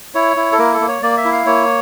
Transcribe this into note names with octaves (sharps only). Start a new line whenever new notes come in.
E4 C#5
E4
A4
A#3 A#4
A4
A#3
C#5
A#3 D5
E5
E4
F5
A#3 C#5